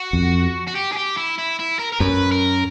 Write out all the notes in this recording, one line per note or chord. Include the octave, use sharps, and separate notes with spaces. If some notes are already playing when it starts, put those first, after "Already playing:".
Already playing: F#4
F2
F#4
G4
G#4
G4
E4
E4
E4
A#4
A#4
F#2 B4
A#4